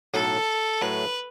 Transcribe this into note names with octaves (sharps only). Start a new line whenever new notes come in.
B1 A2 F#3 A4
A2 F#3 A3 B4